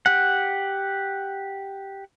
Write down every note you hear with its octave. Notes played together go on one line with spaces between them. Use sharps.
G4 F#5